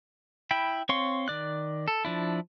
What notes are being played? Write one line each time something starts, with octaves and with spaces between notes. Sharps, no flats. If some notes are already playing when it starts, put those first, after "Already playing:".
E4 G5 B5
C4 C#5 F5 C6 C#6
D#3 D5 F#6
A4
F3 D4 E4